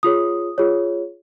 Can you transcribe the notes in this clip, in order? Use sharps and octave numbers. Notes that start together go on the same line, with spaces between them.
F4 G#4 C#5 D#6
F4 G#4 C#5